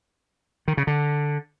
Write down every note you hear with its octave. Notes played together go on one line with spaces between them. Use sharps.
D#3
C#3
D3